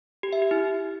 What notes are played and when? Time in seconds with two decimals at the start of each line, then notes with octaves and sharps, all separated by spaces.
0.23 G4
0.33 E5
0.42 G4
0.51 E4